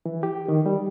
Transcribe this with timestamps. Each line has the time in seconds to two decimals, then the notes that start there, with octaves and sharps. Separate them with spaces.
0.06 E3
0.23 G4
0.48 D#3
0.66 G3